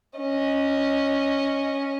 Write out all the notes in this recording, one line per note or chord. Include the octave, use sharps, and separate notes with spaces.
C#4 D#5